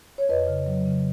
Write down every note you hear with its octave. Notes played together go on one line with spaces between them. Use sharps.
C#5
F2 B4 D#5
C#3
F#3
C#3